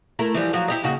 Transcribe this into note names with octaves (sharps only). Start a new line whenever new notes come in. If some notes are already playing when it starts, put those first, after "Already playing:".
A3 E4 A#4
E3 F3 G3
F3 F#3 F#4
E4 G4 D#5
D#2 C#3 F#4